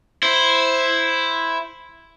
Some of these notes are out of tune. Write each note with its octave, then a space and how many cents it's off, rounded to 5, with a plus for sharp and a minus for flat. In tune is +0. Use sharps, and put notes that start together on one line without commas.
E4 +0 C5 +0